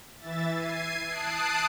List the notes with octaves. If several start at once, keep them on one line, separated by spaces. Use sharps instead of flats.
E3 E5 A6
G#6 C7 D#7
A5 D#6 F#6 C7 D7